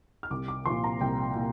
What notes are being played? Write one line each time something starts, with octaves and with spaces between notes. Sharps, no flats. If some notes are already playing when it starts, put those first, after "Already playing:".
F6
C2 D6
D6
A#2 F3 C6
A#5
C2 G5
A#2